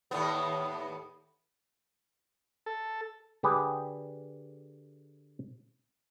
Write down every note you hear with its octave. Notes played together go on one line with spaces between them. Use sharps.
D#2 A2 B3
A4
D3 G4 G#4 B4